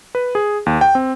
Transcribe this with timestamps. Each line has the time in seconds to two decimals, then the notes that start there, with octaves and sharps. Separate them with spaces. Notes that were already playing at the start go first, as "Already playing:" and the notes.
0.15 B4
0.35 G#4
0.66 D#2
0.81 G5
0.95 C4